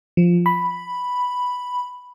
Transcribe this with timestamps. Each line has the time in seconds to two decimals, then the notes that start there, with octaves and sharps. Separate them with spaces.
0.17 F3
0.46 B5